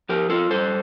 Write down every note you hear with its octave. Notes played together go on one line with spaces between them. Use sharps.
F3 G4 A#4
F4 A4
G2 A4 C5